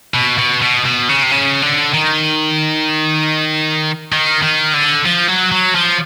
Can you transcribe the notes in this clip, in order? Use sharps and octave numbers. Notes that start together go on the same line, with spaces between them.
B2
B2
B2
B2
C#3
C3
C#3
D3
D#3
D#3
D#3
D3
F3
F#3
F#3
F3